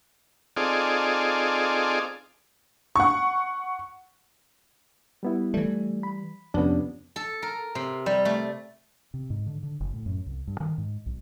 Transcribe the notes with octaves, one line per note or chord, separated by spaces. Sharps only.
C4 D#4 F4 G#4 A4 D5
F#5 C#6
G3 B3 E4
E3 G3 A3
B5
F2 C3 B3 C#4 D4
A4
A#4
C3
G3
A3
C3
G#2
D3
D3
F#1
A2
F#2
C2
G2
D#3
G#2
B1